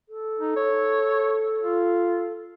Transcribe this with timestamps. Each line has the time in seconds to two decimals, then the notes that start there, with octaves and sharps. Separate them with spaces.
0.09 A4
0.39 D#4
0.56 C#5
1.63 F4